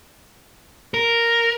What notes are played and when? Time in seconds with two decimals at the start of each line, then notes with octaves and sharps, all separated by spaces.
0.94 A#4